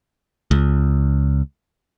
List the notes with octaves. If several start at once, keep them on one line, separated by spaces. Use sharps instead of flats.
C#2